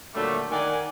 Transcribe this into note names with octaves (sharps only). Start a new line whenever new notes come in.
A#2 D3 F#3 G3 A3
D#3 A#4 D5 F#5 G#5